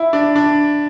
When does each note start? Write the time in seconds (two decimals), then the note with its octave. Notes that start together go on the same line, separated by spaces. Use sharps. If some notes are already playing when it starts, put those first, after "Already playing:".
Already playing: E4
0.13 D4
0.36 D4